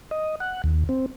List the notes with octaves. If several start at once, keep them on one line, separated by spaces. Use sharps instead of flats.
D#5
F#5
D#2
C4